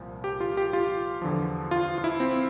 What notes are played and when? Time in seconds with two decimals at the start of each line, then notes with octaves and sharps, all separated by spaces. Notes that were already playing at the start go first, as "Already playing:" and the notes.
Already playing: C2 A#2 F3
0.24 G4
0.40 F4
0.57 G4
0.73 F4
1.22 E2 D3 F3
1.71 F4
1.98 F4
2.04 E4
2.20 C4